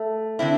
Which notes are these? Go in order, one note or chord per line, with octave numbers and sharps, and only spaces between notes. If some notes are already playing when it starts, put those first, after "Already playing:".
Already playing: A3
D3 C4 E4